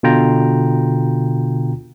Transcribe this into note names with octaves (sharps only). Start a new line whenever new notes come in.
B2 D3 F4 G5 A#5